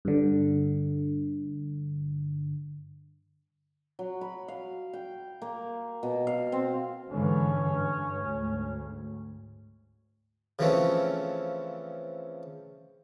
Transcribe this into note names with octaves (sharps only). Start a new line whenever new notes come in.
G2 D3
F#3
B5
F5
G5
A#3
B2
F5
C4
G#2 D3 E3 C#4
G2
D2 G#2
C#3 E3 F3 A3 C4 C#4